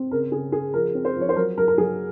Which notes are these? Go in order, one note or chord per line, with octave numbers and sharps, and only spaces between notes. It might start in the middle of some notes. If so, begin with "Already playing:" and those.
Already playing: C4
C#3 A#4
C#3 G#4
C#3 G#4
F3 A#4
C4
C5
F3 C#5
C5
F#3 A#4
F#3 A#4
A#4
F#3 G#4